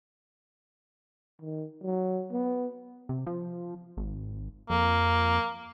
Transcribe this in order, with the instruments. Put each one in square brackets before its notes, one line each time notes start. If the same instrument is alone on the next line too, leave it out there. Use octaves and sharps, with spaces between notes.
[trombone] D#3
F#3
B3
[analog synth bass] C3
F3
G#1
[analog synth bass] F2 [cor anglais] A#3